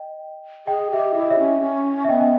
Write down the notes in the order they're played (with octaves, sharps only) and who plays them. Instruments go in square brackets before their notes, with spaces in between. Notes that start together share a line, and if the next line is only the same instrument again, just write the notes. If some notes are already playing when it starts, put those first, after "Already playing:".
Already playing: [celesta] D#5 G5
[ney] G#4 [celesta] D#5 G5
[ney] G4 [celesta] E5
[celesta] D#5
[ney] E4 [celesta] E5
[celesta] D#5
C#5 E5
[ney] C#4
C#4
[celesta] E5
[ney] B3 [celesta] D#5 G5
[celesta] D#5 G5